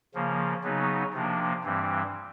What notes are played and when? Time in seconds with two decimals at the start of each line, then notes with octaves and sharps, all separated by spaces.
0.14 C#3 F3 A#3
0.64 C#3 F#3 B3 D#4
1.13 C3 F3 A#3 D4
1.64 G2 E3 G3 C4